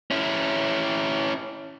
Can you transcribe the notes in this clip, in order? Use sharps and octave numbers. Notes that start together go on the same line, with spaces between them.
C#4 E4